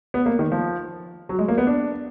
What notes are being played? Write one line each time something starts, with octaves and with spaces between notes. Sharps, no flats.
B3
A#3
D#3
F3
F#3
G#3
A#3
B3
D4